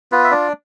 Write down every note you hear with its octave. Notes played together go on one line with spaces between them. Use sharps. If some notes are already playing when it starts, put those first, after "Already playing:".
B3 F4 B4
E5
D4 D5